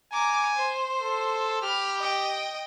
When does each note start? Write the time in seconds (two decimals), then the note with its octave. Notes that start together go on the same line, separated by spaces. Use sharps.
0.12 G#5 A#5 D6
0.55 C5
1.02 A4
1.62 G4 B5 F6
1.98 D#5 G5